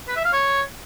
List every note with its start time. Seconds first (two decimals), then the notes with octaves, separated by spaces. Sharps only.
0.08 B4
0.16 E5
0.25 F5
0.33 C#5